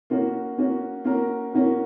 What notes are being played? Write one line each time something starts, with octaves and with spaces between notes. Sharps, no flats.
A#3 C#4 F#4
A#3 C#4 F#4
A#3 C#4 F#4 A#4
A#3 C#4 F#4 A#4